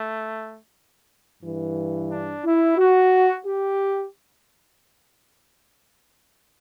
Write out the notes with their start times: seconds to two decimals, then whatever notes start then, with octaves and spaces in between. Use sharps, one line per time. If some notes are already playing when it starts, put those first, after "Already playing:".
Already playing: A3
1.43 G2 E3
2.10 D4
2.45 E4
2.77 F#4
3.46 G4